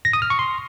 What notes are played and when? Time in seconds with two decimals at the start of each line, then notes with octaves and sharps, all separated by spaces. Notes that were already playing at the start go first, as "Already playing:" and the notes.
0.05 A#6
0.13 D#6
0.22 F6
0.30 C#6
0.39 C6